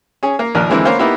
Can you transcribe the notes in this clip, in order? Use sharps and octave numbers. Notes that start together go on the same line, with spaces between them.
C#4 G#4
A#3
A#1 D#2 D#3 A#4 F#6
D3 E3 G#3 A#3 C4 E4
A#3 B3 C#4 C5 F5
A#3 B3 D#4 E4 G4